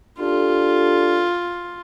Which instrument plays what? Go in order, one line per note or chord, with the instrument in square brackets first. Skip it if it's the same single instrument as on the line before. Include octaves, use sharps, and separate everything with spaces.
[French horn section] D4 G4 A4 [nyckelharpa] F4